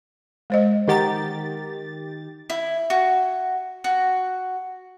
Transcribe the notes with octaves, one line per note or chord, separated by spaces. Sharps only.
G#3 C5 D#5
D#3 G4 D#5 F#5 A#5 A6
E4
F#4
F#4